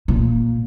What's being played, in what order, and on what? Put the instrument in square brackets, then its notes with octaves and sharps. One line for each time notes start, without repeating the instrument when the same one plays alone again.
[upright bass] A#2